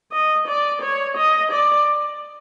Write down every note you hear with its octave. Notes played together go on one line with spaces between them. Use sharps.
D#5
D5
C#5
D#5
D5